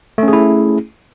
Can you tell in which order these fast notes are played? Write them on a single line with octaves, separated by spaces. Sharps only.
A3 C#4 G#4 E4